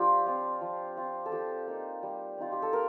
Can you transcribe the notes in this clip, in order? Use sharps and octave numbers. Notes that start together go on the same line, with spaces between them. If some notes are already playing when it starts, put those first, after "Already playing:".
Already playing: F3 D4 F4 G4
C4 F4
F3
C4 F4
A4
F3 G4
A#3 D#4
G3
C4 D#4 F4
G4
A4
A#3 A#4